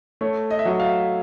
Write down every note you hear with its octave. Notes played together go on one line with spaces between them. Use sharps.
A3 C#5
D#5
E5
F#3 D#5
F5